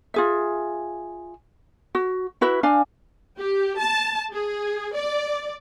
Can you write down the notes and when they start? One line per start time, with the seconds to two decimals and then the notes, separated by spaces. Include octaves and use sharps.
0.14 F4 G#4 E5
1.95 F#4
2.41 E4 F#4 B4 E5
2.63 D4 F5 G#5
3.38 G4
3.79 A5
4.31 G#4
4.96 D5